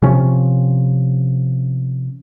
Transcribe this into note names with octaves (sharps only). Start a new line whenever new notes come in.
C3 F3 C#4